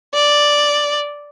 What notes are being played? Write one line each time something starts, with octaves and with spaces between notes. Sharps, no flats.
D5